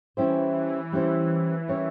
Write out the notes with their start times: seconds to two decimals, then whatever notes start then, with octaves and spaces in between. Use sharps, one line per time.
0.17 E3 G3 C#4 E4 G4 C5
0.92 G3 C#4 E4 G4 C5
1.68 G3 C#4 E4 A#4 C#5